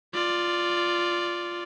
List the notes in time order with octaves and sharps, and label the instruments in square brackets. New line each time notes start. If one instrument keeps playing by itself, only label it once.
[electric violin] F4 D5